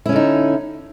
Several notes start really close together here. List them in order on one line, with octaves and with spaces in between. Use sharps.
E4 C#4 D3 D#4